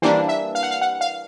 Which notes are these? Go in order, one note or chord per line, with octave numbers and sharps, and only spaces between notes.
E3 G3 A#3 D4 C5
E5
F5
F#5
F5
F#5
F5